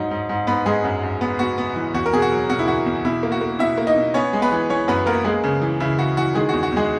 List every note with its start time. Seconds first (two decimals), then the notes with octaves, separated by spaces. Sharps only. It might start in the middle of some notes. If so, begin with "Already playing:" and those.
Already playing: G#2 F#3 D#4
0.11 G#2
0.29 G#2
0.47 G#2 B3 B4
0.66 G#2 G#3 G#4
0.84 F#2
1.03 F#2
1.21 B3
1.39 B3 F#4
1.58 B3
1.76 E3
1.94 E2 F#4
2.06 A#4
2.13 B2 G#4
2.22 F#4
2.32 F#3
2.50 B2 F#4
2.59 E4
2.67 E2 F#4
2.86 E2
3.05 B2 E4
3.23 A#3
3.32 F#4
3.41 A#3
3.59 B2 E4 E5
3.78 A#3
3.87 D#4 D#5
3.96 B2
4.14 B3 C#4 C#5
4.33 G#3
4.42 B3 B4
4.52 E3
4.70 E3 C#4 C#5
4.88 F#2 B3 B4
5.06 A#3 B3 A#4
5.25 G#3 A#3 G#4
5.44 C#3
5.61 E3
5.80 C#3 E4
5.98 C#3 F#4
6.17 E3 F#4
6.35 D#3 G#3 G#4
6.49 E2 F#4
6.63 F#4
6.72 E2 G#3 G#4